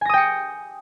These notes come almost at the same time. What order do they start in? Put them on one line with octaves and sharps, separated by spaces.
G#5 A#6 D#6 G5 C#7